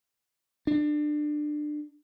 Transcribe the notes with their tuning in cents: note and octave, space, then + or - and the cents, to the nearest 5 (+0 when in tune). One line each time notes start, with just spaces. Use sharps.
D4 +25